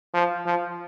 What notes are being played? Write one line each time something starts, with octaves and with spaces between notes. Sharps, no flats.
F3
F3